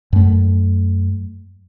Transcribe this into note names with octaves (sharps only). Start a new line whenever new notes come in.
F#2 A3